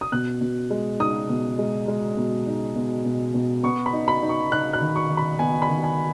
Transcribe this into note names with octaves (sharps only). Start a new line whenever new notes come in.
D#6
B2 F#6
B2
G#3
D#4 D#6
B2
G#3
G#3
B2
D#4
B2
B2
B2
B3 C#6
B5
D#4
B5
D#4
C#6
D#4 F#6
F#6
D#3
C#6
D#3
B5
B3 G#5
B5
D#3
G#5